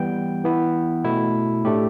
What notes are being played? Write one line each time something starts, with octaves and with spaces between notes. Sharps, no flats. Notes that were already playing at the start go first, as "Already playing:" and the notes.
Already playing: E3 G3 B3 G5
E3 B3 E4
B2 A3 E4
A2 A3 D4 G4